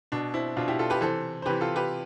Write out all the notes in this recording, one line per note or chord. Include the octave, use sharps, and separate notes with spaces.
B2 D4
C4 E4
B2 D4 F4
E4 G4
F4 A4
G4 B4
C3 E3 A4 C5
C5
C3 E3 G4 B4
F4 A4
G4 B4